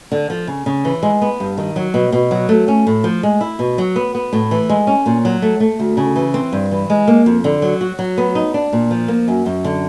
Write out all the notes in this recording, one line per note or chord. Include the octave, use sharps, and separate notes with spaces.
D3
F3
C#3
C#3
E3
G#3
B3
G2
D#3
F#3
B2
B2
F#3
A3
C#4
A2
F3
G#3
E4
B2
F#3
B3
B3
A2
E3
G#3
C#4
A#2
F#3
A3
A3
D2
C#3
E3
C4
G2
E3
G#3
A#3
F2
D3
F#3
F#4
F#3
B3
D#4
D4
A#2
F3
A#3
F#2
F#2
D3